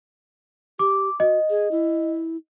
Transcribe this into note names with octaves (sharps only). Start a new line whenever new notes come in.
G4 D6
F#4 D#5
G#4
E4